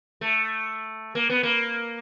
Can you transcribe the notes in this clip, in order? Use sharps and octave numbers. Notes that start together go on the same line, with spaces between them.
A3
A#3
B3
A#3